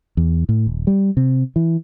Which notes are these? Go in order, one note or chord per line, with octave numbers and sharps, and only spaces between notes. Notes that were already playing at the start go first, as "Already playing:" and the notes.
E2
A2
D#1
G3
C3
E3